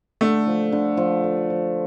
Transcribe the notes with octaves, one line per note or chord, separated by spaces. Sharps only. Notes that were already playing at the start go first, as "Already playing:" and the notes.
D3 A3
F3
D3
F3
D3
F3